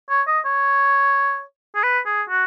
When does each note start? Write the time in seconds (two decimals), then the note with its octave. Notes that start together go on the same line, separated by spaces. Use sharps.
0.10 C#5
0.27 D#5
0.45 C#5
1.75 G#4
1.83 B4
2.06 G#4
2.29 F#4